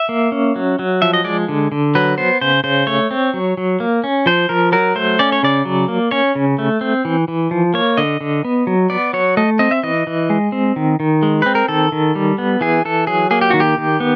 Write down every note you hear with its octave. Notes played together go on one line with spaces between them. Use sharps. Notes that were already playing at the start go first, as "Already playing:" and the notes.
Already playing: E5
A#3
C#4
F#3
F#3
F3 E5
D#5
G#3 D5
D3
D3
F#3 B4
B3 C5
C#3 C5
C#3 C5
A3 C#5
C4
F#3
F#3
A#3
C#4
F3 C5
F3 A#4
F#3 A#4
A3 C5
C#4 D5
C#5
C#3 D5
F#3
A#3
C#4 C#5
C#3
A3
C4
E3
E3
F3
A#3 C#5
D3 D#5
D3
B3
F#3
B3 D5
F#3 C#5
A3 D#5
C4 D#5
E5
E3 D#5
E3
G#3
C4
D#3
D#3
G#3
C4 B4
A#4
D#3 A4
D#3
G3
B3
E3 G#4
E3 A4
F#3 G#4
A#3 G#4
G4
D#3 F#4
G4
D#3
B3